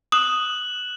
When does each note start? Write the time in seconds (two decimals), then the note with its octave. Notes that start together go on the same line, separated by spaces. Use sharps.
0.12 D#6 F#6 E7 F#7